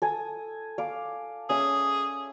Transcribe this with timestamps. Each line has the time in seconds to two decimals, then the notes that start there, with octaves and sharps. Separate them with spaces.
0.02 A4 G#5 D#6
0.78 F5 D6
1.49 C#4 G#4 E5